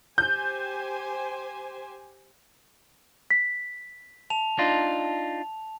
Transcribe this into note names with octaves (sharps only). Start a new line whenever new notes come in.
G4 C5 G#5 G6
B6
A5 F7
D4 D#4 F4